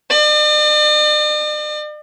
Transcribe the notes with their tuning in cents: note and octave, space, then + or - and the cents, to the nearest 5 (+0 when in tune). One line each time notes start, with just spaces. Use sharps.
D5 +45